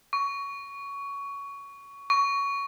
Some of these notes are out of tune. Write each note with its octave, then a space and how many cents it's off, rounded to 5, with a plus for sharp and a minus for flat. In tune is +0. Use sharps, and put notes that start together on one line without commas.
C#6 +15
C#6 +15